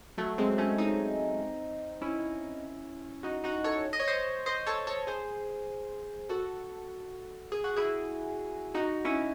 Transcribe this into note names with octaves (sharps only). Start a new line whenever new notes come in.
F#3 A3
G#3 C4
A3 C#4
C4 D#4
C#4 E4
D#4 F#4
D#4 F#4
A4 C#5
D#5
C#5
C5 D#5
C5 D#5
A4 C#5
A4 C#5
G#4 C5
F#4 A4
G#4
F#4
E4 G#4
D#4 F#4
C#4 E4